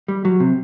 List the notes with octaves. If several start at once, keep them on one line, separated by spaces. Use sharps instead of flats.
G3
F#3
C3